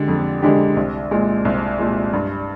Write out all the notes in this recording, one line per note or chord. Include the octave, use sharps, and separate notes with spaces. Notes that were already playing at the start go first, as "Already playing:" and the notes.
Already playing: D3 G#3 D4 G4
F2
D3 G#3 D4 G4
C2
A#2 G#3
C2
A#2 G#3
G2